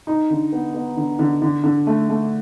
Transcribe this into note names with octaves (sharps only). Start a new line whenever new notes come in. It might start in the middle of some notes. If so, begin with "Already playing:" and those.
D#4
D3
B3
B3
D3
D3
D3
D3
A3
A3